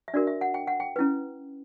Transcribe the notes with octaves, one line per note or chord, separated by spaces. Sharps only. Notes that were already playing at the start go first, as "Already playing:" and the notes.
E5
D4 F#4 A#4 D5
E5
F#5
G5
F#5
G5
C#4 E4 B4